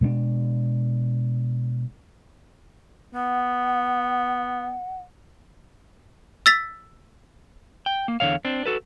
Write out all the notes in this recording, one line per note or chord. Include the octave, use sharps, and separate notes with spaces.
B2 G#3 B3 D4
B3 F#5
E6 A6 B6
G5
A#3
E2 D3 D#3 C#5 F5
C4 D4
F#4 A4 B4